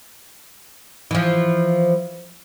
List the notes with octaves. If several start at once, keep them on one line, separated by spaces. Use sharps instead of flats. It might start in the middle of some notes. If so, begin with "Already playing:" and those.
E3 F3